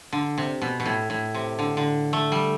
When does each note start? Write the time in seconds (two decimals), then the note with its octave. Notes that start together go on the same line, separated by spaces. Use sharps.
0.13 D3
0.38 C3
0.62 B2
0.80 B2
0.86 A2
1.10 A2
1.34 C3
1.59 D3
1.77 D3
2.13 A3
2.32 G3